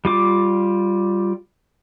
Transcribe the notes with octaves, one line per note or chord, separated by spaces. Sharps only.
G3 F4 D6